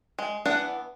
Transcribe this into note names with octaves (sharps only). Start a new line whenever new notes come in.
G#3
E3 B3 D4 F#5